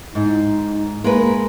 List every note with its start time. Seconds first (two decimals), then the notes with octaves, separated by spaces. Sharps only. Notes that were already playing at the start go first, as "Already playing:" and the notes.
0.15 G#2 D#4
1.04 G#3 A#3 A#4 B4